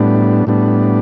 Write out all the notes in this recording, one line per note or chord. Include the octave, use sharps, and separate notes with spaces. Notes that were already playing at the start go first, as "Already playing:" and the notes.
Already playing: A2 G3 B3 D4
A2 G3 B3 D4